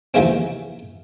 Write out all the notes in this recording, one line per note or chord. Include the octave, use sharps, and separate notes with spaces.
D#2 C3 E3 F3 G#3 C4